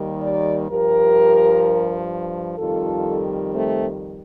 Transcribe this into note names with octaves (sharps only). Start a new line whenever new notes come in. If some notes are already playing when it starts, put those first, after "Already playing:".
Already playing: D#2 D#3 G3
A#4 D5
G2 F3 G4 A#4
F2 D#3 G3 F4 A4
A3 C4